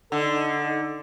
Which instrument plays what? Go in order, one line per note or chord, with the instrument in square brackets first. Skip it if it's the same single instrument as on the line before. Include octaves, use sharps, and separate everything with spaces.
[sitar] D3 [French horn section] D#4 A4